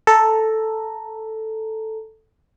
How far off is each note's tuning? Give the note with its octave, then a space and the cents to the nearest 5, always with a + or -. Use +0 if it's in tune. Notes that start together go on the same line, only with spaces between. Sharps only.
A4 +0 A#5 -5